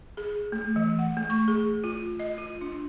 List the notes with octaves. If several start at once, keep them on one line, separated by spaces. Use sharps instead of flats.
G#4
A3
E3
F#5
A3
C#6
G#4
F4
D#5
F4
D4